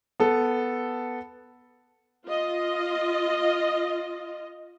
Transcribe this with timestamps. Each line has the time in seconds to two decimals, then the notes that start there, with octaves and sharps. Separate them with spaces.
0.20 B3 A4
2.26 F4 D#5